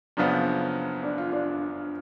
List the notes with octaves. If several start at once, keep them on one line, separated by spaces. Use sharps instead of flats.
F#1 F#2 C#3 F3 B3 D4
D4
F4
D4